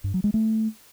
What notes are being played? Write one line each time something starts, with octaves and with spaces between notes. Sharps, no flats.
G2
F#3
G#3
A3